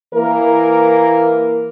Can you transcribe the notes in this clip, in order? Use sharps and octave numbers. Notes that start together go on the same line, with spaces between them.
E3 A#3 A#4